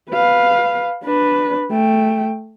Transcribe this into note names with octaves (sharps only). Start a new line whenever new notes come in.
B4 F5
D4 B4
A3 G5